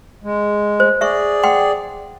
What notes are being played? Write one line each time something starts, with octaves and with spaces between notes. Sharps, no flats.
G#3
C5
G#4 D5 E5 C#6
F#5 G5 C6